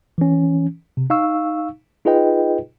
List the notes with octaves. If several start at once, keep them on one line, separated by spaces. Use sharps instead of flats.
E3 C#4
C3
D#4 F5 C#6 E6
D#4 F4 G#4 B4 D#5 G5